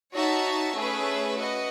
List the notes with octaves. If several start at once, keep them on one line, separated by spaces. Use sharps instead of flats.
D#4 F#4 C#5 E5 A5
A3 C#4 G#4 B4 E5
F#4 B4 D#5